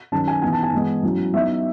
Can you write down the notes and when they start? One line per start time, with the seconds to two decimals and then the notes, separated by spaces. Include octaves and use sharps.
0.12 D#3 F#3 C#4 A5
0.27 G#5
0.42 E3 B3 D#4 G#5
0.52 A5
0.63 G#5
0.73 E3 G#3 B3
1.03 F#3 C#4 E4
1.33 F#3 B3 D#4 E5